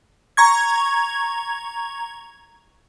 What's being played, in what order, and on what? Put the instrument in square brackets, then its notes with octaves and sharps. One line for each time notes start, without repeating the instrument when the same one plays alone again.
[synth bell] A#5 C#6 G#6